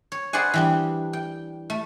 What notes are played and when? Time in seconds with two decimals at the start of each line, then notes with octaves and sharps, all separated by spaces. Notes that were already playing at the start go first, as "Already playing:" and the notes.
0.12 C#5
0.33 G#4 B4 C5 D5 F#5 G#5
0.54 E3 G3 D4
1.13 G5
1.70 A3